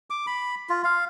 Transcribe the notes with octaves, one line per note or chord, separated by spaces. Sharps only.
D6
B5
F4
F5